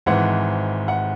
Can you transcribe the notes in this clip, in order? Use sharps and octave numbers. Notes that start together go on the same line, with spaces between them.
G#1 G#2 E3 F#5
F#5